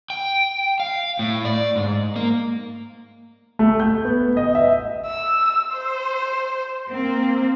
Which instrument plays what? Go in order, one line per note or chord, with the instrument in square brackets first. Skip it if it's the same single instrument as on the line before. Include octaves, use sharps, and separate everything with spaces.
[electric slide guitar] G5
F5
A2
D5
G#2
A#3
[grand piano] A3
G6
B3
D#5
E5
[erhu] E6
C5
[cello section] A#3 C4